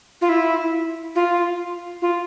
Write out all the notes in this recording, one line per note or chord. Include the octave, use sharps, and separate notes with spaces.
F4
E4
F4
F4